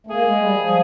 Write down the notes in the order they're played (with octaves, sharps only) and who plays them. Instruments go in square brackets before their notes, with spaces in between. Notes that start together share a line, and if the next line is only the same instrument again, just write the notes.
[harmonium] A3
[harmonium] A#3 [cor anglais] G#4
[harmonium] G#3
G3
F3